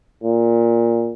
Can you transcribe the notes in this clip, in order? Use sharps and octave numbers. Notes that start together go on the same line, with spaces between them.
A#2